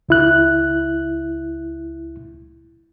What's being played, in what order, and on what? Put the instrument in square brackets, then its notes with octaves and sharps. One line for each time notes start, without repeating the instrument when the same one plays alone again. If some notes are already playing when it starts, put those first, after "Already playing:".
[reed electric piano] C#2 E4 F#6